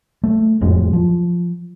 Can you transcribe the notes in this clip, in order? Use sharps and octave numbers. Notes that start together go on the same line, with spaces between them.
A3
D#1 F2 A2 G#3
F3